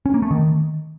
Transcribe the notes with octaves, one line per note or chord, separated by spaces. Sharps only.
C#4
A#3
A3
D#3